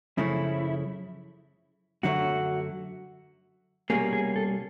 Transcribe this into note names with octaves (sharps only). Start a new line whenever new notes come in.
F#2 C#3 F3 A3 C#4 E4
F#2 D3 F#3 A3 F#4
C2 B2 G3 A#3 C#4 G#4
G#4
A4